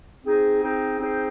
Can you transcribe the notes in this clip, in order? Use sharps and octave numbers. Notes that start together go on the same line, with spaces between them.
C4 D#4 G#4 C5
C4 D#4 G#4 C5
C4 D#4 G#4 C5